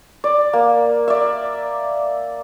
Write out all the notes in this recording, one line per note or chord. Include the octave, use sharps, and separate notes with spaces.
D5
A#3
D5 E5